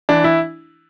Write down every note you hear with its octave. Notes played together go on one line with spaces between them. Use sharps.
E3 D4
E4